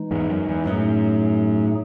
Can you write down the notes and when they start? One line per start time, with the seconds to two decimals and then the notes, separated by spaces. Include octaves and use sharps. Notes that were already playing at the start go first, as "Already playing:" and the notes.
Already playing: E3 G#3 D#4
0.11 E2 G#2
0.29 F#2
0.48 E2
0.65 F#2 A2 F#3 A3 D#4 G#4